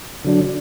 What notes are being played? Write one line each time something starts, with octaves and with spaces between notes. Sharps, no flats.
D3 F#3 D4